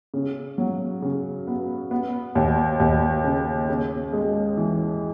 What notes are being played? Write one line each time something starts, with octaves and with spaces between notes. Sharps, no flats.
C#3
F#3
C#3
B3
B3
D#2
D#2
C#3
C#3
G#3
E3